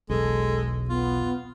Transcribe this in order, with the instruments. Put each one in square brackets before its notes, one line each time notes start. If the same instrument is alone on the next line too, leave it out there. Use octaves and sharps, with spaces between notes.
[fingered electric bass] E1 B1 [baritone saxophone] G#3 [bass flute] A4
[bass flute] B3 [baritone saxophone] F4